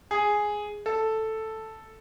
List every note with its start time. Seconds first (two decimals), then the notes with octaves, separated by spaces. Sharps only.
0.11 G#4
0.86 A4